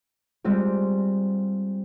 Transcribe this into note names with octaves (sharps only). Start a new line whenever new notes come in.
G3 G#3 C4 F4 G4